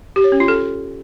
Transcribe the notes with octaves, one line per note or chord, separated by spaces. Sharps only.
G4
C#5
C#4
F4
A4